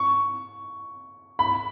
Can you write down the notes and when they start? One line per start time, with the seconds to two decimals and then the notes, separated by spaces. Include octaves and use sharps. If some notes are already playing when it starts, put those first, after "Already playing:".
Already playing: C#6
1.39 B5